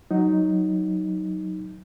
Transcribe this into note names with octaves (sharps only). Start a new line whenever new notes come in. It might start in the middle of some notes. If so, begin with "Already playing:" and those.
F#3 D#4